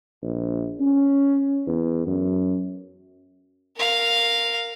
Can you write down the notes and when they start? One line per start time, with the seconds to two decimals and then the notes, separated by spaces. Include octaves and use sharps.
0.22 A#1
0.80 C#4
1.67 E2
2.07 F#2
3.76 A#4 F5